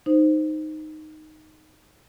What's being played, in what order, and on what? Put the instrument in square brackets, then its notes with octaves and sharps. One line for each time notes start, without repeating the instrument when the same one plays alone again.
[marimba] D#4 C5